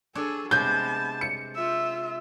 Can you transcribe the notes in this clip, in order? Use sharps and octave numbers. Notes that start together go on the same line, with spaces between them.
D4 G#4 A4 C#5
C3 G#3 B3 A5 G6
C#7
F4 E5